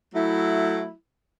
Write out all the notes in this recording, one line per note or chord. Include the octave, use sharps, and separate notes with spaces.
F#3 A3 E4